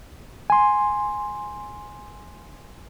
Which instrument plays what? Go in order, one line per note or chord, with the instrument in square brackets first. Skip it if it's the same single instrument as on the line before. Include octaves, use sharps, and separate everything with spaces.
[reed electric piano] G#5 C6